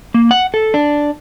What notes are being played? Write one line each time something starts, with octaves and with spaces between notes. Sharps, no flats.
A#3
F#5
A4
D4